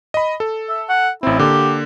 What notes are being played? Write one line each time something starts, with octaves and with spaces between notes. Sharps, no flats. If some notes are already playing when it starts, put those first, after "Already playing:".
D#5 B5
A4
E5
F#5
A1 C4 E4
D3 A#3 G4